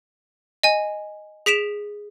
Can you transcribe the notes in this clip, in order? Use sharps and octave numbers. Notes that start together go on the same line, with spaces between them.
D#5 G#5
G#4 B6 D7 E7 F7